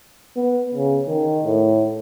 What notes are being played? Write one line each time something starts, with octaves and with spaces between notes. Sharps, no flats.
B3
C#3
D#3
A2